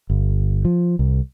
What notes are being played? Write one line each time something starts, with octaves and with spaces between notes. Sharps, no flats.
G1
F3
C2